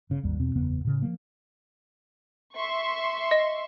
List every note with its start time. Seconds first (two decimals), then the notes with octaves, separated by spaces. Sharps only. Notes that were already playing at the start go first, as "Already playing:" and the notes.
0.10 G1 C#3
0.23 G#1 D#2 G3
0.39 E2 B2 C4
0.55 F#1 E2 C#3 B3
0.85 A2 C#3
1.02 F3 G3 A#3
2.55 E5 C6 C#6
3.31 D#5